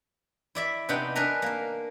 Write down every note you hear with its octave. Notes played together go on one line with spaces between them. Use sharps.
E4 D5 E5
C3 B3 D4 D#4 G5
D4 G#4 A#4 B4 A#5
A#3 A#4